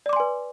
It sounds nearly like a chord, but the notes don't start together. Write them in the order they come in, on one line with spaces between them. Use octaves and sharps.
D5 D6 C6 G#5 B4